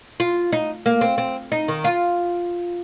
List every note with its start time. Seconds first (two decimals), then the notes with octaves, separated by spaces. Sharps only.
0.20 F4
0.52 D#4
0.86 A#3
1.01 C4
1.18 C4
1.52 D#4
1.68 D#3
1.84 F4